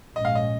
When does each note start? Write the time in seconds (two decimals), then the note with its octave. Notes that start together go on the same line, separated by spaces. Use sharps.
0.16 A#1 G#2 G#3 C#4 D#5
0.25 F5
0.35 D#5